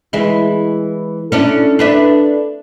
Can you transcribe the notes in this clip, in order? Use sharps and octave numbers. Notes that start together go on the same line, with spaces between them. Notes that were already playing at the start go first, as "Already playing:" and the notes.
E3 G#3 E4
C#4 D4 E4 A4
D4 B4 E5